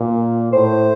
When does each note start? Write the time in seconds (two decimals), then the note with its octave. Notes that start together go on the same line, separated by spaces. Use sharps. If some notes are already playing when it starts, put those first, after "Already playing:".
Already playing: A#2
0.52 A2 C5